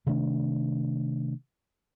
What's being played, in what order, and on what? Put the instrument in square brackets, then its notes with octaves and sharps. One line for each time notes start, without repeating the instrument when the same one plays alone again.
[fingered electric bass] C3 D#3 A3 D4